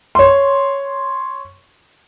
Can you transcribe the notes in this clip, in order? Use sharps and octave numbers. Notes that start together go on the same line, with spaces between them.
C#5 C6